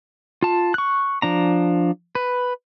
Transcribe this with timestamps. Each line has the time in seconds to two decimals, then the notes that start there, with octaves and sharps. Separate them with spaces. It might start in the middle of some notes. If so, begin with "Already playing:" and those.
0.42 F4 A5
0.74 C#6 F#6
1.22 F3 D4 A#5
2.15 B4